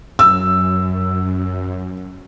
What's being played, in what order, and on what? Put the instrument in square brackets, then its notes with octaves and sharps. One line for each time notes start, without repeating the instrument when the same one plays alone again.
[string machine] F#2 [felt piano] E6